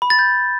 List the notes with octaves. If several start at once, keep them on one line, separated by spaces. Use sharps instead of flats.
B5
A6
G6